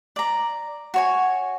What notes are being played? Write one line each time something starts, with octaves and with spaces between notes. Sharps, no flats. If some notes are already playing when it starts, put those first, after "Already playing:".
D5 A#5
F#4 C#5 G#5